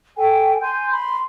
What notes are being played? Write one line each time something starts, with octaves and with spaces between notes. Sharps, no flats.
A4 G5 G#5
G#5 C6 G6
B5 C6